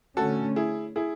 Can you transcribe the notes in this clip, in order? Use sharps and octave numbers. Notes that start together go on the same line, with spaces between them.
D3 A3 C#4 F#4 A4
E4 G#4
E4 G#4